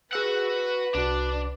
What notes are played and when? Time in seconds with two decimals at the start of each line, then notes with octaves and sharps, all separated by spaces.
0.13 F#4 G#4 B4 F#5 E6
0.95 C2 D4 F#4